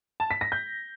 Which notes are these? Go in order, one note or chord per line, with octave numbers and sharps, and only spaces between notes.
A5
B6
A#6
G6